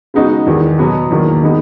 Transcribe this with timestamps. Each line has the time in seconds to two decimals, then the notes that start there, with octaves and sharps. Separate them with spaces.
0.14 C#3 G#3 B3 D#4 F#4
0.47 E2 D#3 G#3
0.78 B2 F#3 B3 F#4
1.10 E2 D#3 F#3 A#3
1.43 D#3 G#3 B3 D#4